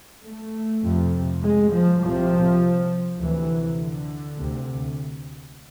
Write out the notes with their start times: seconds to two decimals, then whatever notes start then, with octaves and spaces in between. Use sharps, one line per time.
0.25 A3
0.83 F2 C3
1.42 G#3
1.71 F3
2.01 C2 C3 F3
3.18 D2 C3 E3
3.77 D3
4.37 D2 C3